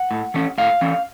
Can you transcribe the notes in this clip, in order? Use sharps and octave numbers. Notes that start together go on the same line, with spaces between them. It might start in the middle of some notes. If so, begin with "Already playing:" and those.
Already playing: F#5
A2
E3 A3 C#4
A2 F5
E3 A3 C#4